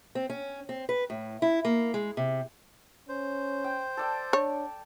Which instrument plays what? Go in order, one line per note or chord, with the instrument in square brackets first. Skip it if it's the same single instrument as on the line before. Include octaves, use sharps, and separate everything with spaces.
[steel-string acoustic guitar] C4
C#4
C4
B4
A2
E4
A#3
G#3
C3
[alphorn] C#4 [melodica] C5
[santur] G5
A4 D5 G5
[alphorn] D4 [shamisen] C#5